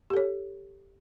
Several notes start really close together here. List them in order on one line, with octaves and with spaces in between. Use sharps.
G4 A4 C#5